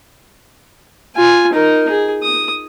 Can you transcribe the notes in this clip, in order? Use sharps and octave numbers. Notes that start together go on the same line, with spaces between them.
F4 G#5
D#4 A#4
G#4
D#6